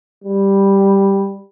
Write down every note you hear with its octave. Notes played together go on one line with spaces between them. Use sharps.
G3